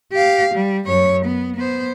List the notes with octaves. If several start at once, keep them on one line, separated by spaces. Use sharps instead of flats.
G4 F5
G3
F#2 C#5
B3
B3 C5